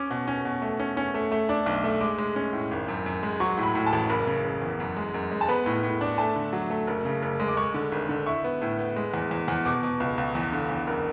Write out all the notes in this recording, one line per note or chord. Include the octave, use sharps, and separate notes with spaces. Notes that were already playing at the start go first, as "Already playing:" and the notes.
Already playing: C#4 D6
B2
C#4
B2
A3
C#4
C#4
A3
A3
D4
B1
A3
G#3 D6
G#3
C#4
A2
G#1
F#2
F#2
G#3
F#3 C#6
A2
B5
A2
A5
A1
F#1 B5
C#3
F#1
E2
F#2
G#3
F#2
G#3
A5
B3 B5
A2
A2
D4
A3 A5
D3
F#3
A3
F#1
C#3
F#1
G#3
D6
G#3 C#6
D3
G#1
D3
E4 C#6
B3
A2
B3
G#3
E2
E2
E2
B2 D6
B2
C#2
C#2
E2
D3
E2
F#1